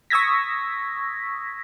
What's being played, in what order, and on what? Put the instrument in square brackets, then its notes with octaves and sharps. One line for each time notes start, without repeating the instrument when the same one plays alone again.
[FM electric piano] C#6 D#6 E6 G#6 A#6 B6